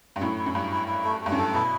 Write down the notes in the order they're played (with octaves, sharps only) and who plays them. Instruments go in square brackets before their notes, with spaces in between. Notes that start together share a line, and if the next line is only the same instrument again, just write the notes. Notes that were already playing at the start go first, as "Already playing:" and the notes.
[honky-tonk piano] G2
[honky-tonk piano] F#2 A2 [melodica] E4
[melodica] E4
[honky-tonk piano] F#2
[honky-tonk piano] G2 [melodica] E4
[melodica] E4
E4
A3
A3
[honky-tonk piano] G2
F#2 A2
[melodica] A4
[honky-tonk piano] B2 [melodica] E4